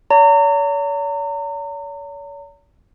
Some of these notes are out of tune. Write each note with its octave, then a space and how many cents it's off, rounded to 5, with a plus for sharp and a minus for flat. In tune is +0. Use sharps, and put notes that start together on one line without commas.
C#5 +45 A#5 -35